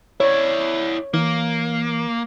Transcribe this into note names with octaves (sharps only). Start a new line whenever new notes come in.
E4 C#5 D5
E3 A#3